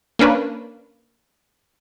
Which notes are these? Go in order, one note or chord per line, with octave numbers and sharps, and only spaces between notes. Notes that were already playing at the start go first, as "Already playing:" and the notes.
A#3 C#4 D4 B4